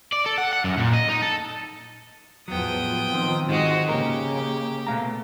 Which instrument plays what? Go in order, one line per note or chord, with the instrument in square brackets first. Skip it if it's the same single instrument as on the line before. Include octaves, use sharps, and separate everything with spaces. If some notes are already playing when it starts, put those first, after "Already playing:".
[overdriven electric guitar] D5
A4
F#5
F#5
F#2
A#2
D#5
D#4
A4
[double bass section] E2 A2 F3 [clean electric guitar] F#3 B3 [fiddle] G5 D#6
[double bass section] D#3 F3 C4
[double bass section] G#2 [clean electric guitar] D#3 [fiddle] G#3 F#4
[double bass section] C#3 A#3 [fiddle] G4 [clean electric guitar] A#4
[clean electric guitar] B2 F5 A#5 [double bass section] A3